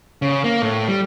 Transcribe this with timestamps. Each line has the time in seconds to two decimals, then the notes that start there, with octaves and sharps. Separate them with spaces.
0.22 C#3
0.44 A#3
0.62 A2
0.88 G3